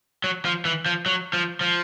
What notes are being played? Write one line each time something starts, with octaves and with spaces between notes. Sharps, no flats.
F#3
F3
E3
F3
F#3
F3
F3